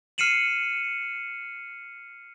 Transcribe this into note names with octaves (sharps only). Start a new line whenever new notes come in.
F6 C7 C#7 D#7 E7 F#7